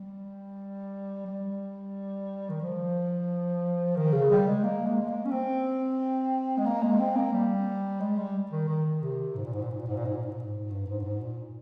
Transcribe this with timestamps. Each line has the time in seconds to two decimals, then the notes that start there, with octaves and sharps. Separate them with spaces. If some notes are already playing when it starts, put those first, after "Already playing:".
Already playing: G3
1.26 G3
2.49 D#3
2.61 F3
3.96 D#3
4.13 C#3
4.30 G3
4.47 G#3
4.63 A#3
4.86 G#3
5.02 G#3
5.08 A#3
5.25 C#4
5.31 C4
6.58 G#3
6.66 A#3
6.83 G#3
6.99 C4
7.16 A#3
7.33 G3
8.00 G#3
8.18 G3
8.51 D#3
8.68 D#3
9.02 C3
9.35 G#2
9.44 A#2
9.53 G#2
9.62 A#2
9.70 G#2
9.79 A#2
9.88 G#2
9.96 A#2
10.05 G#2
10.14 A#2
10.22 G#2
10.31 A#2
10.39 G#2
10.70 G2
10.87 G#2
11.00 G2
11.04 G#2
11.21 A#2